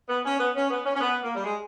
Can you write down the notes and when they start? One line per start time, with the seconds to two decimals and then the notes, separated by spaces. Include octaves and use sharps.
0.09 B3
0.25 C#4
0.39 B3
0.55 C#4
0.70 B3
0.85 C#4
0.95 C#4
1.00 B3
1.22 A#3
1.35 G3
1.44 G#3